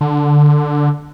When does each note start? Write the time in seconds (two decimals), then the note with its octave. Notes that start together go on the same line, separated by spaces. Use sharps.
0.01 D3